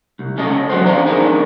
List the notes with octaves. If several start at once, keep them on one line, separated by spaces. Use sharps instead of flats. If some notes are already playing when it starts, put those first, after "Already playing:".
C2
C#2 C#3 C#4 A4 D#5
E2 D3 F#3 F#4 B4 C5
E3 C#4 C5 D5 F5 A#5
E2 D4 D#4 G#4 A#4 B5